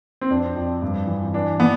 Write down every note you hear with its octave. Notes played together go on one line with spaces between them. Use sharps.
C4
F2 D4
F2
G2
E3
E3 D4
E3 B3